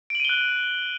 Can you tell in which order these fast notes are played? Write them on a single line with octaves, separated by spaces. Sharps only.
D7 F#7 D#7 G7 F#6